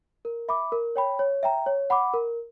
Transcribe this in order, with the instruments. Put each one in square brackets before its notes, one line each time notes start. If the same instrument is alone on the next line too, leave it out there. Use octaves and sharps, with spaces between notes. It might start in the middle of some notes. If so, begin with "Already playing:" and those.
[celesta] A#4
E5 B5 D6
A#4
C#5 G5 B5
C#5
E5 G5 A#5
C#5
F#5 B5 D6
A#4